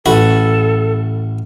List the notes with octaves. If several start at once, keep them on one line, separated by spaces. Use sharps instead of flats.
A1 F#4 A4 B5